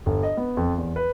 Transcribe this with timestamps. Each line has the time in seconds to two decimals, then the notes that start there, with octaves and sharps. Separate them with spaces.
0.06 G1
0.23 D#5
0.37 B3
0.57 F2
0.78 E2
0.96 B4